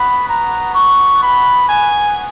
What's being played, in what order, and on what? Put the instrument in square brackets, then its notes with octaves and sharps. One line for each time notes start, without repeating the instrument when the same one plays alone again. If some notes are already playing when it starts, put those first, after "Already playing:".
Already playing: [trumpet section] B3 F#4 B5
A#5
C#6
B5
G#5